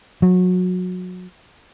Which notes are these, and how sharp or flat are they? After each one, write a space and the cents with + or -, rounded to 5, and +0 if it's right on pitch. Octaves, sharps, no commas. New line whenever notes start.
F#3 -25